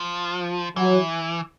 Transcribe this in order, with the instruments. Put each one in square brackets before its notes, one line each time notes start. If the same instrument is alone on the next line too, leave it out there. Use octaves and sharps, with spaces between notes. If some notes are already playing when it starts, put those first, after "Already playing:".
Already playing: [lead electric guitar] F3
[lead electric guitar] E3 [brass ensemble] F#3